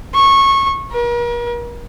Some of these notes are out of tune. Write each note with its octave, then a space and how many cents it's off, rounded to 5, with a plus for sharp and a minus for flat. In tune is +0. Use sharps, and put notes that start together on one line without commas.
C#6 -20
A#4 +40